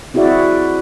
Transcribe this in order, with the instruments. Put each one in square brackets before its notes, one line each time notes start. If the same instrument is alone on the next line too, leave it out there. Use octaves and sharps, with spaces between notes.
[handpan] C4 E4 F#4 G#4 D5 E5